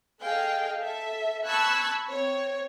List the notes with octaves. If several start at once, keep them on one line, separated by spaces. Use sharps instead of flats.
G#4 A4 D#5 F5 G5
A4 E5
A5 B5 C#6 E6 F#6 G#6
C4 C#5